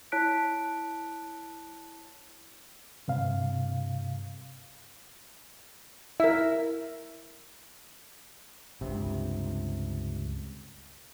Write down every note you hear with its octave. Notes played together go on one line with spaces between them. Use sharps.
E4 C#5 A5 F#6 B6 D7
G2 C3 F5
E4 A#4 E5
C#2 G2 C3